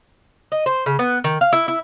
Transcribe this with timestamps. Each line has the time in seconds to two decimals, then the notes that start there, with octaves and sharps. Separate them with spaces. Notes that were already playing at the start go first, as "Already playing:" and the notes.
0.52 D#5
0.66 C5
0.86 C#3
0.99 B3
1.24 D#3
1.41 F5
1.53 E4
1.68 E4